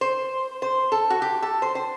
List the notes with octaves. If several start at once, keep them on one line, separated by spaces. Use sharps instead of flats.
C5
C5
A4
F#4
G4
A4
C5
C5